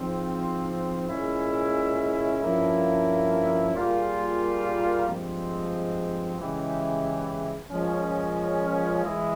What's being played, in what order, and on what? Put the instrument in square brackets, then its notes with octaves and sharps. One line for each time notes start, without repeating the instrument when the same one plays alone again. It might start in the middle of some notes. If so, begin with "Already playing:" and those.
Already playing: [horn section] G#2 F3 C4
A#2 G#3 C#4 E4
G2 F3 A#3 C#4 E4
A#2 G3 A#3 F4 G#4
G2 F3 G#3 C4
C#3 E3 G#3 E4 G4
A#2 F3 G#3 C#4
E3 G#3 E4